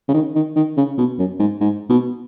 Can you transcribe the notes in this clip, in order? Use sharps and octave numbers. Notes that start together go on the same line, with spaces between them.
C#3
D#3
D#3
D#3
C#3
B2
F#2
G#2
G#2
B2